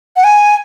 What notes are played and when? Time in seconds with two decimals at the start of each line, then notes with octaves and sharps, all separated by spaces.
0.16 F#5
0.24 G#5